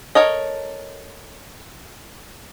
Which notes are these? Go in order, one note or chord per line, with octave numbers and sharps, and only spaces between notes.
A4 A#4 C#5 D#5